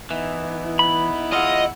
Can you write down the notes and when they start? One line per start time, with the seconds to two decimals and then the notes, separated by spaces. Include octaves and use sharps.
0.11 E3 B3 D#4 E4
0.79 B5
1.33 E2 E4 F4 D#5 F#5